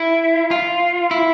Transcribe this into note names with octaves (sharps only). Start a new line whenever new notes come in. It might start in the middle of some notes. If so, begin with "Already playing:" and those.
Already playing: E4
F4
E4